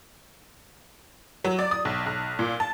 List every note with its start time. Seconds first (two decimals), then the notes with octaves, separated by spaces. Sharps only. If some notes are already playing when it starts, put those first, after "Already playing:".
1.44 F#3
1.59 D5
1.71 D#6
1.85 B1
2.06 B1
2.39 A#2
2.60 A5